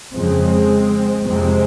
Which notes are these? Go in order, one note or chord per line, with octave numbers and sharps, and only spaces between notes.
F2 C#3 G#3 C4
F2 C3 G#3 C4